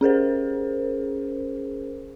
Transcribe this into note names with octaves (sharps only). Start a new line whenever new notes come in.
C#4 G#4 A#4 C5